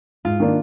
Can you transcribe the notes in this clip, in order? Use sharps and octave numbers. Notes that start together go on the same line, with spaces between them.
G#2 F4
D#3 A#3 D4